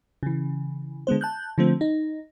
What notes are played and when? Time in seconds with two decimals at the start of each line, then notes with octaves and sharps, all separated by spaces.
0.23 C#3 E3
1.07 D3 G#3 B3 C5
1.21 A5 F#6 G6
1.58 D3 F3 A3 C4
1.81 D#4